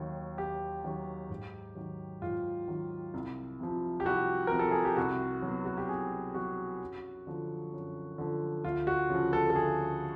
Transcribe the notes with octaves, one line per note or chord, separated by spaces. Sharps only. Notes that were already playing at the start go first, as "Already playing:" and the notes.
Already playing: D#2 D#3 F#3
D#2 G4
D#3 F#3
G#2
D#3 F#3
G#2 F4
D#3 F#3
C2
C3 F3
G4
C2 F#4
C3 F3 A#4
A4
G#4
G4
C2 F#4
B2 F#3
F#4
G4
C2 G#4
B2 F#3 F#4
F#2
D3 F3
F#2
D3 F3
D2 F4
F#4
C#3 F3
A4
A4
D2 G#4